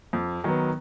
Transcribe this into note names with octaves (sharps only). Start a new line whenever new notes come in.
F2
D#3 F#3 B3